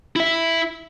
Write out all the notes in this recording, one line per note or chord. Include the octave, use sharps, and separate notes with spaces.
E4 E5